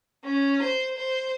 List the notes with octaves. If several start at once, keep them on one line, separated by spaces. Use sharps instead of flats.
C#4
C5
C5